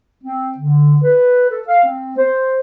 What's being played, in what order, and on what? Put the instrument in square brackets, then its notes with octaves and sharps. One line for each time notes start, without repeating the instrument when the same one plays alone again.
[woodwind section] C4
D3
B4
A4
F5
C4
C5